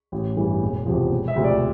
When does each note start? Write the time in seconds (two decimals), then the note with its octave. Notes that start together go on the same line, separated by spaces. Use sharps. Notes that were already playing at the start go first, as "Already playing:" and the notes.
0.12 A1
0.37 G2 E3
0.62 E1
0.86 E2 C3 F3
1.12 E1
1.28 E5
1.36 D2 C3 F3
1.44 D5